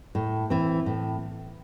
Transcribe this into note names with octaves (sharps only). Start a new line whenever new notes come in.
A2
E3 C4
A2